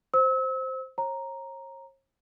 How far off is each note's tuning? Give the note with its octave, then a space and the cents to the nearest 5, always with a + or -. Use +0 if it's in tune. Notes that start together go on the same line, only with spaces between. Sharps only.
C5 +0 E6 -35
C#5 -45 A#5 +0